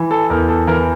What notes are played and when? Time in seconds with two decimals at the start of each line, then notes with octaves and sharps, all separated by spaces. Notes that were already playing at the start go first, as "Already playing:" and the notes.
Already playing: E3
0.11 A4
0.30 E2 A#4
0.48 A4
0.67 E3 A#4